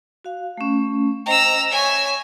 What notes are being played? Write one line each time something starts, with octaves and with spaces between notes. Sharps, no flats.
F#4 F5
A3 C#4
C5 D#5 G5 A#5 E6
C#5 E5 G#5 C#6